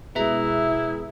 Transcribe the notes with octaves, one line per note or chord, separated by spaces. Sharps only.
B2 G#3 E4 G#4 B4 E5 A#5